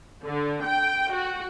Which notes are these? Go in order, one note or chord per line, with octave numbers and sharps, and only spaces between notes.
D3
G5
F#4